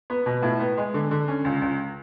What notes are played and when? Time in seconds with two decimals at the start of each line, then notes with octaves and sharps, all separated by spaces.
0.10 B3
0.26 B2
0.43 A2
0.60 B3
0.77 G#3
0.94 D3
1.11 D3
1.28 C#4
1.45 C#2
1.62 C#2